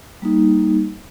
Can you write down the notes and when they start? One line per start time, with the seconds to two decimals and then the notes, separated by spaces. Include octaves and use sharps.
0.22 G3 A#3 D#4